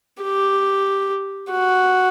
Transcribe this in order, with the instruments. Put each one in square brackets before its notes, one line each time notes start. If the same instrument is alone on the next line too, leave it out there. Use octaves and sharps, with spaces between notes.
[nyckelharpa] G4
F#4